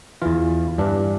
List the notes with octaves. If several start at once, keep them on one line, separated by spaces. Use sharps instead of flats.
E2 E3 F4
G2 E3 D4